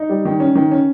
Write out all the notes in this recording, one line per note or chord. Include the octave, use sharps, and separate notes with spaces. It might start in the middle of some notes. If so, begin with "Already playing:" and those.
Already playing: D#4
G3
D#3
C#4
D#3
C#4